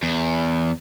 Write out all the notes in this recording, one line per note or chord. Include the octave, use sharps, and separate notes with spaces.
E2